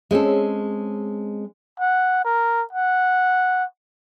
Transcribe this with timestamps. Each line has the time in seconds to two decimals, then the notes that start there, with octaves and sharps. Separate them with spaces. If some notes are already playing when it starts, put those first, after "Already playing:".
0.11 G#3 C4 C#4 A4
1.80 F#5
2.25 A#4
2.73 F#5